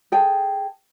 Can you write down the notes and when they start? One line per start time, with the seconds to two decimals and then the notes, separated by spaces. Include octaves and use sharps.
0.12 G#4 A4 G5